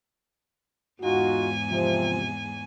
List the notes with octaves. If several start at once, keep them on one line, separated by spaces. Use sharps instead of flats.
E2 G#2 D#4 F4 F#4 G#5
C3 F3